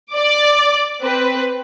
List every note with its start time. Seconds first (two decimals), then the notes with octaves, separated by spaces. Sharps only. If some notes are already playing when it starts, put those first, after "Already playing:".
0.12 D5 D6
1.01 C4 B4